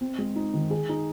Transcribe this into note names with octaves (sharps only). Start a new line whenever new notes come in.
C4
G#3
D#4
D#3
G#4
D#4